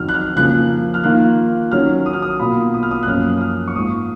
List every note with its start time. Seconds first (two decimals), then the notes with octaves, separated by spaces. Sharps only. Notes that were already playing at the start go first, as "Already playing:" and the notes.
Already playing: F2 D#3 F#3 F6
0.09 F#6
0.14 F6
0.36 C#3 F3 A#3 F#6
0.94 F6
1.04 D#3 A#3 F4 F#6
1.71 D#3 F#3 C#4 F6
2.06 D#6
2.13 F6
2.22 D#6
2.39 B2 A#3 F4 B5
2.74 D#6
2.83 F6
2.91 D#6
3.03 F#6
3.07 F#2 F3 A#3 C#4 F6
3.37 D#6
3.41 F6
3.68 C#6
3.75 G#2 F3 A#3 D#6